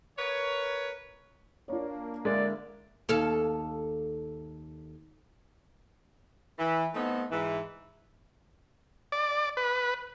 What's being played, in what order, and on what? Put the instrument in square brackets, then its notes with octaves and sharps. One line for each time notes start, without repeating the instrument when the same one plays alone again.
[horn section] A#4 B4 C#5
[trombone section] A#3 D4 [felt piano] F4 C#5
[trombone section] D3 A#3 E4 [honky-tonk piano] G#3 [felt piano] A#4 [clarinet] D5
[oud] D#2 A4 F5
[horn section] E3
A3 B3 C4 D#4 A4 D#5
G#2 E3
[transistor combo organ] D5
B4